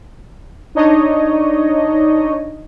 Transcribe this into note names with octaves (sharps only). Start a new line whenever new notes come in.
D4 D#4 C#5 D#5